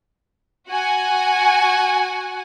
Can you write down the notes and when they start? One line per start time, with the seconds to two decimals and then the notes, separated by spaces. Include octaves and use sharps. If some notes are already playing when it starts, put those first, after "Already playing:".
0.69 F#4 F#5 G#5